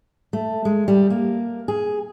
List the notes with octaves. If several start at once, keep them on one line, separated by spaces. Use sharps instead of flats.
A3
G#3
G3
A#3
G#4